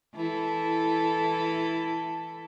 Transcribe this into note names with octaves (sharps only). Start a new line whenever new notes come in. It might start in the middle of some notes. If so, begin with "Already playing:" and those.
E3 E4 A4